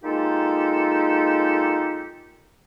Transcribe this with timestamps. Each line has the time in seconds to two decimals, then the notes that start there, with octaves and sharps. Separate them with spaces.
0.03 G#3 A#3 D#4 F4 G4 A4